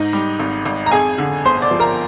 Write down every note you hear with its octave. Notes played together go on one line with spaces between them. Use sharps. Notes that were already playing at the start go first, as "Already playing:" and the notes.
Already playing: G#2 D#4 D#5
G3
G#1
G#1
A#5
F2 G#4 G#5
D3
G1 C5 C6
D5 D6
F3
A#4 A#5